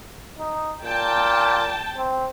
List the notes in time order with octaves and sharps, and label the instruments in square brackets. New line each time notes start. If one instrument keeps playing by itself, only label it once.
[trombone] D#4
[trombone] A#2 [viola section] G5 A5
[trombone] C4